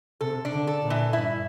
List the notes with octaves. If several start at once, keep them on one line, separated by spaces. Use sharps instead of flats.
C3 A4
D4
D3
A4
A#2
E3
G2 E4